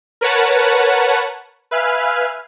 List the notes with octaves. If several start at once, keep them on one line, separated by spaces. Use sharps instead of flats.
A#4 B4 C#5 F#5 A5
B4 E5 F5 G#5 F6